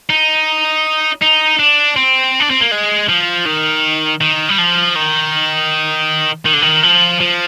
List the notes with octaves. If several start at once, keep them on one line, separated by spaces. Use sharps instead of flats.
D#4
D#4
D4
C4
D4
C4
A#3
G#3
F3
D#3
D#3
G3
F3
D#3
D#3
D3
D#3
F3
F3